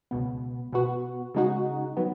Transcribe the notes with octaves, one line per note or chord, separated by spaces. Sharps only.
C#2 B2 B3
B2 B3 F#4
C#3 G#3 D#4 F#4
D#3 F#3 B3